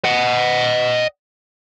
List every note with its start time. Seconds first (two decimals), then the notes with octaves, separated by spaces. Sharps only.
0.04 D#5 F#5